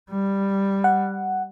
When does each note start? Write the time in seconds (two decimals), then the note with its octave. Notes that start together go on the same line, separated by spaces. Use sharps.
0.11 G3
0.84 F#5